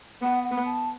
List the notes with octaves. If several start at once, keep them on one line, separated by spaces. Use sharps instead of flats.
B3 F#5
F#5
B3
A5